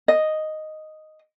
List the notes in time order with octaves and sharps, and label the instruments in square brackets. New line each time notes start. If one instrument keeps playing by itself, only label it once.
[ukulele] D#5